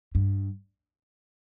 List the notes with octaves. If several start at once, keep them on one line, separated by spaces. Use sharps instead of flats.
G2